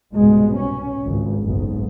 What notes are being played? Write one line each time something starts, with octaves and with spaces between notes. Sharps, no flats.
C2 G#2 B2 G#3
C#4
G#1 C#2
F#1 B1 G#2